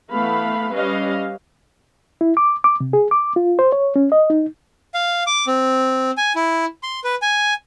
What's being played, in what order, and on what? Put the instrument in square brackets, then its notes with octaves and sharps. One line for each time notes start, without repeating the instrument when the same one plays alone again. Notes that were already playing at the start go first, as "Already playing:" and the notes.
[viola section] E3 A3 B3 F5 B5
G3 C#4 B4 D#5 F5
[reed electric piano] E4
D6
D6
C3
G#4
D6
F4
C5
C#5
C#4
D#5
D#4
[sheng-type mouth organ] F5
D6
C4
G#5
E4
C6
B4
G#5